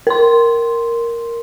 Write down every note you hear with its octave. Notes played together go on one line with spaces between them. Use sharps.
A#4 C6